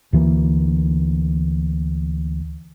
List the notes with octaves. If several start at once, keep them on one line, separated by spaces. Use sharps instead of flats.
D2 E3 F#3 A#3